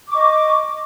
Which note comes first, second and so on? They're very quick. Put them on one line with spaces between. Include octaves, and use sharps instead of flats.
D6 C#6 D#5